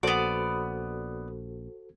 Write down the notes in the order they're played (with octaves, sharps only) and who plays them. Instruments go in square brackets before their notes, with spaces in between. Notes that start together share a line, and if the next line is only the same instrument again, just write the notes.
[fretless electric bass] A#1 [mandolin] B3 D5 [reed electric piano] F#4 A4 C5